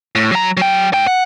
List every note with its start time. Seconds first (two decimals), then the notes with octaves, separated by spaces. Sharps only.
0.15 A2
0.32 F#3 A#5
0.57 F#3 G5
0.93 G#2 G5
1.07 F#5